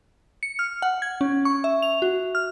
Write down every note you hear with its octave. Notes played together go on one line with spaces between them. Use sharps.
C#7
F6
F#5
G#6
C#4
C#6
E5
F7
F#4
F6